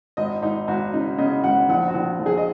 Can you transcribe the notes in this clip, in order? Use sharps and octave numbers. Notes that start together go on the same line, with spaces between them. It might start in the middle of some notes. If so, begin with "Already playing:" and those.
G#1 D#5
G#1 D#4
G#1 F#4
C#3 D#4
C#3 D#5
G#1 F#5
A#1 F#5
F#4
A#1
A#1
G#4
D#5